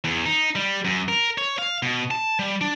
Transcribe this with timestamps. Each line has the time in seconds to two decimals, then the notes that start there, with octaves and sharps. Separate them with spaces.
0.04 E2
0.26 D#4
0.55 G3
0.85 F#2
1.08 A#4
1.38 C#5
1.58 F5
1.83 B2
2.11 A5
2.39 G3
2.61 D4